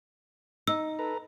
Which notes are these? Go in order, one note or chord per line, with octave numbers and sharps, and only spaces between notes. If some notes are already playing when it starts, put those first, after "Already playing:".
D#4 E6
A4 B4 A#5